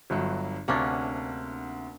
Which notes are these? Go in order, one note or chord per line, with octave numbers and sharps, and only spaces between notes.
G1 G2 F#3
D2 C3 A#3 C#4 D4 F#5